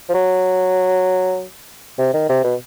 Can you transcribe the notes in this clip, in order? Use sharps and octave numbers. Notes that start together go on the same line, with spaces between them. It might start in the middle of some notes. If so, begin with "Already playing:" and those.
F3
F#3
C3
D#3
C3
B2